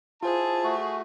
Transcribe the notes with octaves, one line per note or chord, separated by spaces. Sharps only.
E4 F4 G#4 C5 A5
A3 F#4